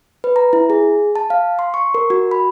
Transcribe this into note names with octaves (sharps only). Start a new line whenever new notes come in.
B4
A#5
E4
G#4
A5
F5
C6
C#6
A#4
F#4
B5